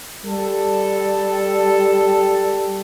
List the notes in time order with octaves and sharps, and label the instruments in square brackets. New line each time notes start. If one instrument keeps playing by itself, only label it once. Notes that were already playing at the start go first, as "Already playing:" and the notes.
[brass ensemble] G3 A4